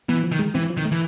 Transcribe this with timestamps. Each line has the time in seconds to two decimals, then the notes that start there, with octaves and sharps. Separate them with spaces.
0.09 E3 B3
0.24 F3
0.32 D#3
0.39 G#3
0.54 E3 C4
0.70 F3
0.77 D#3
0.85 A3
0.92 E3